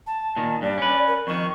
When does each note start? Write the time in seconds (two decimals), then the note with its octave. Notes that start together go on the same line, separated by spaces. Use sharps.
0.07 A5
0.36 A#2 D#3
0.62 G2 D5
0.78 C#4 B4
1.07 A#4
1.27 F2 D#3 C#6